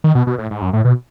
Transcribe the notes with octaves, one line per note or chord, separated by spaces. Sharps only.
D#3
B2
B2
A2
G#2
F#2
A2
B2